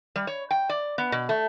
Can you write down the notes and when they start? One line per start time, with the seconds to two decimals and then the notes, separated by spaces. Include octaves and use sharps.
0.16 G3
0.27 C#5
0.51 G5
0.69 D5
0.98 B3
1.12 B2
1.29 A3